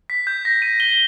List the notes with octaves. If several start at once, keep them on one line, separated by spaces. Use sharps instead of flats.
B6
G6
A#6
D#7
G7